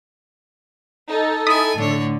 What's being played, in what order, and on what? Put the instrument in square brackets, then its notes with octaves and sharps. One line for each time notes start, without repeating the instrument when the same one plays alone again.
[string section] D#4 [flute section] A4
[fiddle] E4 G#5 [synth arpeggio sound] D#6 B6
[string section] A2 D3 [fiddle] D4 C#5